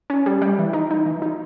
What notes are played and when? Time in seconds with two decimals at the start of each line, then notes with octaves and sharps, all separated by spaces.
0.10 C#4
0.26 G3
0.42 G3
0.58 E3
0.73 D#4
0.91 D#4
1.06 E3
1.22 D#4